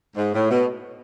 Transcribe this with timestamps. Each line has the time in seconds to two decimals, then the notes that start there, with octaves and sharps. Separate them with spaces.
0.16 G#2
0.33 A2
0.50 B2